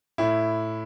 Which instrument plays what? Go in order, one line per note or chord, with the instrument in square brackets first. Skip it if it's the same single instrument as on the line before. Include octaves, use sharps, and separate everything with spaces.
[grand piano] A2 E4